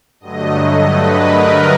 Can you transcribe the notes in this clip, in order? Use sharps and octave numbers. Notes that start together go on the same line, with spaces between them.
G2 D3 F#3 A3 D#5
D#5
B4
A#4